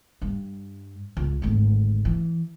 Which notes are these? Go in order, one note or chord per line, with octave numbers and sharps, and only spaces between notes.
G2
C#2
G#1 D2
E3